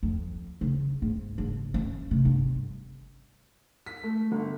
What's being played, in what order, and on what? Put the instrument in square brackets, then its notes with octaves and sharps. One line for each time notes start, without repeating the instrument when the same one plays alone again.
[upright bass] F2
C#3
G#2
F#1
C#4
C3
G1
[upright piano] B6
A3
G1